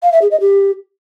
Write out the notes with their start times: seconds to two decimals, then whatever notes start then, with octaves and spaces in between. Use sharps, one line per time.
0.03 F5
0.12 E5
0.22 G#4
0.31 D#5
0.40 G4